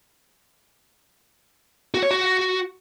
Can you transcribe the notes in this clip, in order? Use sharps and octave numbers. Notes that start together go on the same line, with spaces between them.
F#4
C#5
F#4